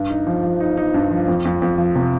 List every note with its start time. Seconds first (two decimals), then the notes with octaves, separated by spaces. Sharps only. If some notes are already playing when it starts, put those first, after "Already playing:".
Already playing: G2
0.10 D#4
0.27 F3
0.43 F3
0.60 D#4
0.77 D#4
0.94 G2
1.11 F3
1.28 F2
1.45 F2
1.62 F2
1.78 F3
1.95 C3